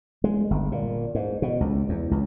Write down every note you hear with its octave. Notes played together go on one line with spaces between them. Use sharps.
G#3
G1
A#2
G#2
B2
C#2
E2
C#2